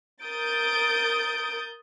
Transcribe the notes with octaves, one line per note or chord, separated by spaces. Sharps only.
A#4 D#6 G6 A6 D7